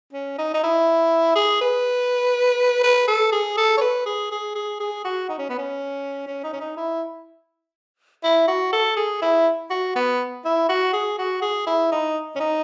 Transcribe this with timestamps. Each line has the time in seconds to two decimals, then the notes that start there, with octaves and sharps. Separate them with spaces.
0.13 C#4
0.39 D#4
0.54 D#4
0.63 E4
1.36 G#4
1.61 B4
2.83 B4
3.08 A4
3.32 G#4
3.57 A4
3.77 C#5
3.81 B4
4.06 G#4
4.32 G#4
4.55 G#4
4.80 G#4
5.05 F#4
5.29 D#4
5.39 C#4
5.50 B3
5.59 C#4
6.27 C#4
6.44 D#4
6.53 C#4
6.61 D#4
6.77 E4
8.24 E4
8.48 F#4
8.73 A4
8.97 G#4
9.22 E4
9.70 F#4
9.96 B3
10.45 E4
10.69 F#4
10.93 G#4
11.19 F#4
11.42 G#4
11.67 E4
11.92 D#4
12.36 C#4
12.40 D#4